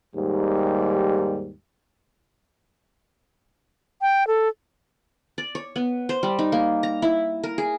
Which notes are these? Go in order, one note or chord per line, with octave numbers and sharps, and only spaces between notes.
D#2 G#2 G3
G5
A4
D5
C#5
B3
C5
G3
D#4
A#3
A#5
E4
A#4
G#4